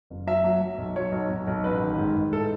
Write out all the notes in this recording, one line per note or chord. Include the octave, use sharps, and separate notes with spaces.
F#1
F#3 E5
F#3
F#3
B1
F#3 C#5
B1
B1
B1
A1 B4
D#3
G#2
G#2
A2 A4